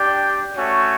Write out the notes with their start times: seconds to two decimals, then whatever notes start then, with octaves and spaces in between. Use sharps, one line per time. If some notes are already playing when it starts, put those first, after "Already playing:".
Already playing: D4 G4 D5 G5
0.56 A3 C#4 F#4 C#5